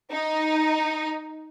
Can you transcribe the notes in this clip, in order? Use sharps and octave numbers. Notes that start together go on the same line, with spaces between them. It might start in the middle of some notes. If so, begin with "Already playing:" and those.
D#4